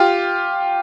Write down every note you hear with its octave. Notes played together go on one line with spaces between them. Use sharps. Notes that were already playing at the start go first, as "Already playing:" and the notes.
Already playing: F4 G4